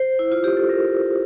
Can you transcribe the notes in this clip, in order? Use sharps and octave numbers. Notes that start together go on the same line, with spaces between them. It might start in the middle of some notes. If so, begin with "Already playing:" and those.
Already playing: C5
E4
F4
G4
A4
A#4